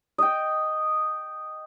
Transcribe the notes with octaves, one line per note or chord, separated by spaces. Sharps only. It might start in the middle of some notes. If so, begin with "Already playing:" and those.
D#5 G5